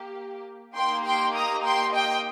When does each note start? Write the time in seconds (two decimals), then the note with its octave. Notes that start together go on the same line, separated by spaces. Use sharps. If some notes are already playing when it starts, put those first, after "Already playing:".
Already playing: A#3 G4
0.75 A#3 D#4 G4 G5 C6
1.05 G5 C6
1.35 A#5 D#6
1.64 G5 C6
1.94 D#5 G5